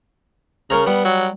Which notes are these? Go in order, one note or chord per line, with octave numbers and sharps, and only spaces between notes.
C#3 A#4 C#5 A#5
G3 B3
F#3